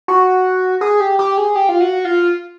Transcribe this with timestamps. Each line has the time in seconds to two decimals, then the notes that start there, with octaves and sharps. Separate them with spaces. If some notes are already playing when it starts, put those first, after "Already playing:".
0.08 F#4
0.81 G#4
1.00 G4
1.19 G4
1.37 G#4
1.56 G4
1.69 F4
1.81 F#4
2.05 F4